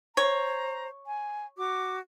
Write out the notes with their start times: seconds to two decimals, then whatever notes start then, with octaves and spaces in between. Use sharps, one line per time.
0.17 C5 C#5 A#5
1.07 G#5
1.58 F#4 D6